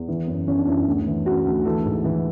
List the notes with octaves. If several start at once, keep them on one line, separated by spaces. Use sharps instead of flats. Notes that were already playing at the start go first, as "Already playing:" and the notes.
Already playing: E2
E3
F#2
E3 C#4
D4
F#2 E4
E4
D2
E3
C#3 F#4
D2
E3 A4
G#2
E3